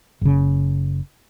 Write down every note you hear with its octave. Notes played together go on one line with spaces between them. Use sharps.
F#1 C#3